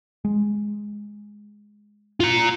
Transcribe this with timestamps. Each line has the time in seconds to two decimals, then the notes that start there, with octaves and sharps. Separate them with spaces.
0.25 G#3
2.20 F4 A#5